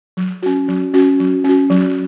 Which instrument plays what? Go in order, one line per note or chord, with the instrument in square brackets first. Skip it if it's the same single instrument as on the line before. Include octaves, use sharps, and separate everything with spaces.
[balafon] F#3
C#4 F#4
F#3
C#4 F#4
F#3
C#4 F#4
F#3